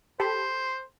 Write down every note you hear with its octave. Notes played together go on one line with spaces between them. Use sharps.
G4 A4 C5 B5